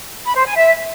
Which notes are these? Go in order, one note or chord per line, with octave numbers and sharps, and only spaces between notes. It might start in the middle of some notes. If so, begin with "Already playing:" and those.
B5
C5
G#5
E5